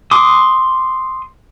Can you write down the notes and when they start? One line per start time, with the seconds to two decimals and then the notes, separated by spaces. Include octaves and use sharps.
0.11 C6 D6 D#6